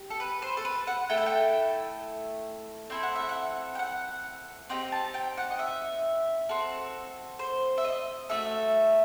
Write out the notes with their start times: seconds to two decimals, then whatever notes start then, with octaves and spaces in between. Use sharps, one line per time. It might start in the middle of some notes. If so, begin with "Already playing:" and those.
Already playing: G4
0.10 A4
0.20 B4
0.42 C5
0.57 A4
0.65 B4
0.87 F#5
1.10 A3 E4 A4 G5
1.17 F#5
1.26 G5
2.90 C4 E4 A4 G5
3.03 F#5
3.16 E5
3.29 F#5
3.75 G5
3.79 F#5
4.69 C4 D#4 G4 G5
4.92 A5
5.14 G5
5.37 F#5
5.51 D#5
5.59 E5
6.49 C4 F#4 A4
7.39 C5
7.78 E5
7.84 D#5
8.29 A3 D#4 F#4 A4 E5